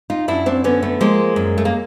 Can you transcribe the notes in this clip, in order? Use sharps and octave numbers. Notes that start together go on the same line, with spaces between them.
D#4 F4
F#2 D4 E4
C4 D4
D3 B3 C#4
A3 B3
F3 G#3 A#3
F#2
A3
A#3